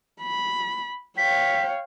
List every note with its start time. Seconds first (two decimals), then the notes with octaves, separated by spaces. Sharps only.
0.22 B5
1.18 C#5 F5 G5 B6